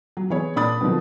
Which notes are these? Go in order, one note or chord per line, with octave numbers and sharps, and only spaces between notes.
F#3
E3 B3 G#4 C#5
A#2 D4 B5 D#6 A6
B2 D3 D#3 F3 C4